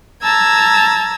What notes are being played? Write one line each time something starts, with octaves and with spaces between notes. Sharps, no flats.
A5 A#5 E6 G#6